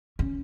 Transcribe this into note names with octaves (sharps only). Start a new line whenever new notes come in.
C#4